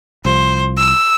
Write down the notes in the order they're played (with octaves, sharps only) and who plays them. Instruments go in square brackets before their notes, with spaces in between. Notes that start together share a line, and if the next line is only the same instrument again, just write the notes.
[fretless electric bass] C2 F3 [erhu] C5
[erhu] E6